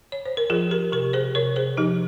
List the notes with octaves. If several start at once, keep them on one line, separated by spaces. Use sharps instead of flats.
C#5
C5
A#4
F3 F4 G#4
G4 A#4
C3 G4 A#4
G#4 C5
C3 A#4 C#5
G#4 C5
F3 D#4 G4